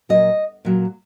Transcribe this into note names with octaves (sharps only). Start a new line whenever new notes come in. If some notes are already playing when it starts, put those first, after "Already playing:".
A#2 F#3 D#5
A#2 F#3